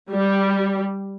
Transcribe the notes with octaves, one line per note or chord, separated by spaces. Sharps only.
G3